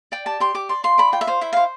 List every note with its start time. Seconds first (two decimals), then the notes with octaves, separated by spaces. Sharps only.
0.12 D5 G5
0.26 G4 A5
0.40 G4 C6
0.55 G4 D6
0.69 D5 C6
0.84 F4 C6
0.98 D5 B5
1.12 F4 G5
1.21 E5
1.27 C5 F5
1.41 E4 E5
1.53 C5 F5